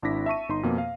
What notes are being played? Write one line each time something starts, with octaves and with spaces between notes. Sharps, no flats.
G#1 D4 E4 D6 A#6 B6
E5 A5 C#6 D#7
G1 D#4 C6
F2 B2 A#3
F5